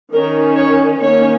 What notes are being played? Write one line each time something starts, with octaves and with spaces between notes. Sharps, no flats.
D#3 C#4 A#4
C#5
D#3 A#3 C#4 C#5